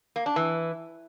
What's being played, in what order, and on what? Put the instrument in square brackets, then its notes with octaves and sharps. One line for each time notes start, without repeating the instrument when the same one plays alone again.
[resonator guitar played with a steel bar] A#3
D4
E3